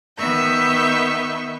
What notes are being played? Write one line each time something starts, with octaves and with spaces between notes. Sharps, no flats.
D#3 B3 E5 C#6 G6